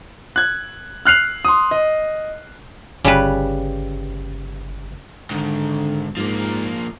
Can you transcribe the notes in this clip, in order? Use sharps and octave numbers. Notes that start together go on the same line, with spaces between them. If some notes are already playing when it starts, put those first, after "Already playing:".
F#6 G#6
F6 F#6 C7 F7
C6 D#6
D#5
G1 C#3 G3 B4
G#2 D3 D#3
G#2 F3 A#3